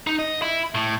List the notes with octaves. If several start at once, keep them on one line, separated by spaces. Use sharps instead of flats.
D#4
D#5
E4
A2